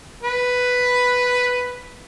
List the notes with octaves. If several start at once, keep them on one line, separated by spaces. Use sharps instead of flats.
B4 B5